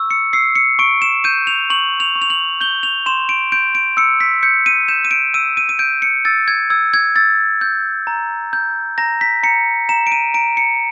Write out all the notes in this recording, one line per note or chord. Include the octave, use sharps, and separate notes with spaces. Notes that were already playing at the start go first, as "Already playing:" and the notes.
Already playing: C#6 E6
C#7
E6 C7
C#7
C#6 D7
E7
G6 D#7
F7
C#6 F#7
F7
C#6
F7
F#7
G6 G7
F7
C6 E7
D7
G6 D7
D7
E6 C#7
B6
G6 C#7
D#7
G6 E7
D#7
D7
E6 D#7
D#7
D#7
G6 D7
C#7
E6 A6
G#6
E6 G#6
G#6
E6 A6
G6
A#5
G6
A#5 A#6
B6
A#5 C#7
A#5 E7
D7
D#7
A#5 D7
C#7